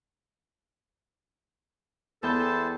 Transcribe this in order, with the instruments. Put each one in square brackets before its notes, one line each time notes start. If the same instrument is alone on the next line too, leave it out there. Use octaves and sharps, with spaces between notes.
[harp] E2 G5 G6 [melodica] E4 C5 A5 [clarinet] A4